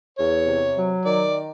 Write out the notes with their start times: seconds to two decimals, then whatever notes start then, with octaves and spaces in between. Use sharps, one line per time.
0.18 E2 C#5
0.46 C3
0.76 F#3
1.05 D#3 D5